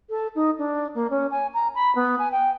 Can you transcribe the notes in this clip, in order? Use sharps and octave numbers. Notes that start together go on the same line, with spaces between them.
A4
D#4
D4
A#3
C#4
G#5
A#5
B5
B3
G#5
G5